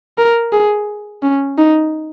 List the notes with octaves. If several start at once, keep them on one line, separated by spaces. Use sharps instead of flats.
A#4
G#4
C#4
D#4